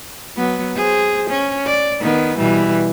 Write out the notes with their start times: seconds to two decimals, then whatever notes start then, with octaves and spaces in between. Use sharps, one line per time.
0.36 F#3 B3
0.76 G#4 C5
1.30 C#4
1.66 D5
2.01 D#3 B3
2.38 B2 E3 G3